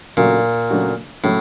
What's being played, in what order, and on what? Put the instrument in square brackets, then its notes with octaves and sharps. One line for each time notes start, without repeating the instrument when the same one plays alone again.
[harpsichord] A#2 [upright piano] C#3 F#3 A3 D4 F#4
[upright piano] C#3 F#3 A3 D4 F#4
[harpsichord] A2 [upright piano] C#3 F#3 A3